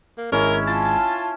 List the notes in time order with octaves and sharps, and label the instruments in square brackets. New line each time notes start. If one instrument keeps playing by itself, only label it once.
[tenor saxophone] A#3
[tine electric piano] G#1 G#3 [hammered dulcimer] C#4 E4 [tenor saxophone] A#4
[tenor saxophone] F4 [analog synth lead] A5